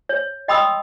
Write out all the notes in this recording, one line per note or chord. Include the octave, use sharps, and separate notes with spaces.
C#5
D#5 G5 B5 C6 D#6 E6